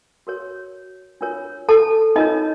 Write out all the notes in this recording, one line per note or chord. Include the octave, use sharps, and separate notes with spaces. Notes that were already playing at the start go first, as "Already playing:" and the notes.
F#4 A#4 C#5
D4 F4 A#4 C#5
A4 A5
D4 D#4 F4 A#4 C#5 D#5